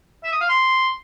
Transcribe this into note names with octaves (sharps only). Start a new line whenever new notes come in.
E5
D#6
F5
C6